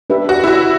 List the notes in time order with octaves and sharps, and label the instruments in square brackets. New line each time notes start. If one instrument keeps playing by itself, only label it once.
[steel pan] D4 G4 B4 E5
[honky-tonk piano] F#4
E4
F#4